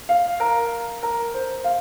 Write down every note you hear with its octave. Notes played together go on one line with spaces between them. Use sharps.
F5
A#4
A#4
C5
F5